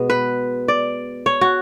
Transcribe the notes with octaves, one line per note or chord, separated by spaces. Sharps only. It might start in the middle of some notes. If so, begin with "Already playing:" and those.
Already playing: B2 G#3 B3
B4
D5
C#5
F#4